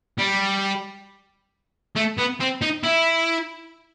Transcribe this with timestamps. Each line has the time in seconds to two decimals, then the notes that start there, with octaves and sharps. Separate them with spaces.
0.18 G3
1.96 A3
2.17 B3
2.40 C4
2.62 D#4
2.84 E4